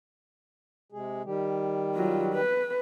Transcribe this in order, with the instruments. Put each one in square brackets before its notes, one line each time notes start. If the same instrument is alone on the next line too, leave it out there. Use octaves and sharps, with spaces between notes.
[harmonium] C3 G#3 G#4
D#3 G3 G4
[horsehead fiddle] F#3 F4
B4